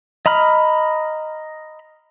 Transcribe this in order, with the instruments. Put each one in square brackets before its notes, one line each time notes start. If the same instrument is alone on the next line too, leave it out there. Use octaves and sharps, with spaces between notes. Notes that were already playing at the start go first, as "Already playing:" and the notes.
[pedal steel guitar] D#5 A#5 B5 F6